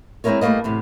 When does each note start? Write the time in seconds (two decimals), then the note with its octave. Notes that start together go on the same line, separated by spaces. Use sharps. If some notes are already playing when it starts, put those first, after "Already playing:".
0.24 G#3 C4 D4 E4 A#4 C#5
0.41 G2 C#3 A3 A#3 D#5
0.64 E2 A2 C3